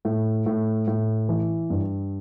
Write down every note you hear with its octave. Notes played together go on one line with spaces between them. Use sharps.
A2
A2
A2
E3
G2